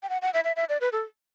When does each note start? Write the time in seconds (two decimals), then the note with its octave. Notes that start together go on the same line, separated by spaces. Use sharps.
0.03 G5
0.09 F#5
0.22 F#5
0.34 E5
0.44 E5
0.56 E5
0.69 D5
0.81 B4
0.92 A4